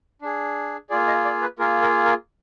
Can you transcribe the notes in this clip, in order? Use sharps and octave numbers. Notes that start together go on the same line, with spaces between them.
D4 G#4
A#3 F4 G#4 D5
D#5
D5
B4
A#3 F4 G#4 A#4
A#4
A#4